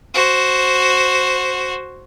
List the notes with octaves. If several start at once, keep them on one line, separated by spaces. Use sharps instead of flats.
F#4 C5